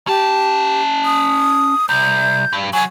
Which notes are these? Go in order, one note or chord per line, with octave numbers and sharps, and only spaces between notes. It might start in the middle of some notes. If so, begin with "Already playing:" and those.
C#4 G4 A5
D#6
C2 G6
G2
C2 F#3 G#5